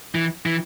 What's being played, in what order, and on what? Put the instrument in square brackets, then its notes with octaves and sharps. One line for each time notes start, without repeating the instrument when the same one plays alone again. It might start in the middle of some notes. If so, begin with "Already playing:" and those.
[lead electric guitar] E3
E3